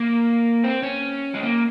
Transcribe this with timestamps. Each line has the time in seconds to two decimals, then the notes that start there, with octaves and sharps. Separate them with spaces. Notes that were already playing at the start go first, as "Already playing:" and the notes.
Already playing: A#3
0.64 C4
0.83 C#4
1.34 G#3
1.43 A#3